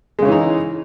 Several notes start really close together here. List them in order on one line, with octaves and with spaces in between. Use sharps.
G#3 C#3 C#4 E3 D#4